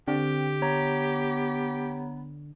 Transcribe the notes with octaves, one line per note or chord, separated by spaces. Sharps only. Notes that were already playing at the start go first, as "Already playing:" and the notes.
D3 C4 G4
B3 C#5 A#5